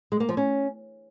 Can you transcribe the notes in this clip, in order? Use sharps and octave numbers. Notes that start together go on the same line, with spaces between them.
G#3
A#3
F3
C#4